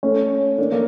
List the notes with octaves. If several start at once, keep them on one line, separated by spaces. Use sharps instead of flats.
A3 C#4
A#3 D4
A#3